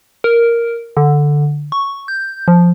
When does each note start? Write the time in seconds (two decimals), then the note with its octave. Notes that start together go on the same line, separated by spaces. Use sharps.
0.24 A#4
0.97 D3
1.72 C#6
2.08 G6
2.48 F3